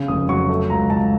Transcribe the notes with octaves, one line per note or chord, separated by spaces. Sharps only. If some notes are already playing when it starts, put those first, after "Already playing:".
Already playing: C#3
F1 D#6
F#3 C#6
A3
C#2 A#5
C#2 A5